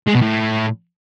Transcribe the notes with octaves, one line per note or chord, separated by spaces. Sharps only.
G#3
B2
A2